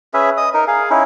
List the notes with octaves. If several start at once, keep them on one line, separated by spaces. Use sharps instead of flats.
C#4 G#4 B4 E5
D#5 D#6
D#4 A#4
G#4 F5
C#4 D#4 E4